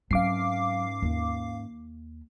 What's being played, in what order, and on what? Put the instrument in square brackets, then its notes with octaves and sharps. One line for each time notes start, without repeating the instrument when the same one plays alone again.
[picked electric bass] G#2 C#4 [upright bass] F#3 C4 [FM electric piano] F5 D6 C7
[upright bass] D#2